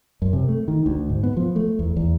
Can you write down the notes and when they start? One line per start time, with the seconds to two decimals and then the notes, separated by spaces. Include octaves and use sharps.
0.22 F#2
0.33 C3
0.48 A3
0.68 D#3
0.86 D2
1.10 G#2
1.23 B3
1.37 F3
1.56 A3
1.79 E2
1.97 E2